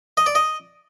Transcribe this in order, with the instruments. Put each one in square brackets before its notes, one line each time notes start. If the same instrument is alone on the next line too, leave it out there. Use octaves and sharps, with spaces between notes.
[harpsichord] D#5
D5
D#5